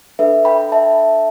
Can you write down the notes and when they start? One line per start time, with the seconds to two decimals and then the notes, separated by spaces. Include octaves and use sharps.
0.19 D4 A4 B4 E5
0.45 G5 B5
0.72 E5 A5